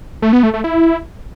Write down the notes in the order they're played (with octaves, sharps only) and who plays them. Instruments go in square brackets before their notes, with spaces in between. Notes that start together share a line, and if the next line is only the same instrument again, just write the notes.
[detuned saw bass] A3
B3
A3
A3
E4